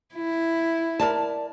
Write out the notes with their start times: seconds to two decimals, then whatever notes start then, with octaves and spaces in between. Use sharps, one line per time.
0.15 E4
1.00 A#4 D5 A5